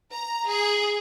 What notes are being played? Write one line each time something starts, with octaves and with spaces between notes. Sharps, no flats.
A#5
G#4